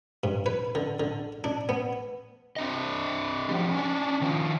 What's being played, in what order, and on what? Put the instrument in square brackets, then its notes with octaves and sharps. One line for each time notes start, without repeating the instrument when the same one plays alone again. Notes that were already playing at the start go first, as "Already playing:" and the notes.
[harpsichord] G2
B4
D3
D3
D4
B3
[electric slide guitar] C4 D4 D#5
F3 G3
C#4 D4
D#3 F3